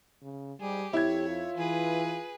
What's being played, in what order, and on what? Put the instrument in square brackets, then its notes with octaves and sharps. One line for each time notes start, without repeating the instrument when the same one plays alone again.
[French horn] C#3
[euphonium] G#2 [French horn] G3 [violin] G4 G#4
[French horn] F2 [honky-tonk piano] E4 G#6 [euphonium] G4 [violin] C#5
[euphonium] F4
[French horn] E3 [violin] G#4 B4